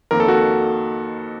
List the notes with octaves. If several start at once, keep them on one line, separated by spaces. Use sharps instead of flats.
F2 D#3 A#3 A#4
A4
F#4